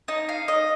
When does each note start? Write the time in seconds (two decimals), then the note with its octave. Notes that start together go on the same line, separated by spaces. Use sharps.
0.08 D#4
0.29 F5
0.48 D#5